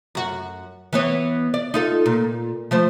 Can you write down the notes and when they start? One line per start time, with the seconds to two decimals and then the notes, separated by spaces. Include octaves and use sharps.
0.15 F#2 F#4
0.93 E3 B3 C#5
1.54 D5
1.74 D#4 F4 A4
2.06 A#2
2.71 F3 A3 C5